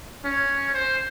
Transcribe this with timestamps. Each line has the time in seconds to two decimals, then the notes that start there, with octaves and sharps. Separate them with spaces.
0.24 C#4
0.74 C5